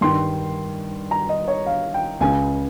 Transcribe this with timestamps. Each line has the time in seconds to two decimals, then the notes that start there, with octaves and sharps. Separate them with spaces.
0.01 G2 D#3 C6
1.11 A#5
1.29 D#5
1.48 C#5
1.66 F5
1.94 G5
2.20 C#2 C#3 G#5